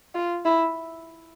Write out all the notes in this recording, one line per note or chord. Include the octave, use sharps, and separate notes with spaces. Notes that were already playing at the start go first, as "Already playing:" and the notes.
F4
E4